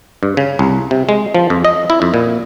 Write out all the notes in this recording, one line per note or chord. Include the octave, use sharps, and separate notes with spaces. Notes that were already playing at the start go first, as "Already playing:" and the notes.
G2
C#3
C2
C3
G#3
F3
F2
D#5
E4
F2
A#2